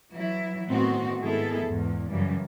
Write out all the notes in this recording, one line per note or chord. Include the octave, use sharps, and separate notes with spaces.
E3 F#3 E4
A2 D#3 B3 C4 F#4
G#2 D#3 B3 E4 G#4 A4
E2 G#2
F#2 C#3 E3 G3